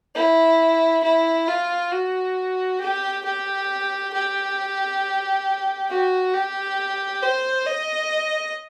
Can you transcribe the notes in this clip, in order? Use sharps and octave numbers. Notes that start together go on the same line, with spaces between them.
E4
E4
F4
F#4
G4
G4
G4
F#4
G4
C5
D#5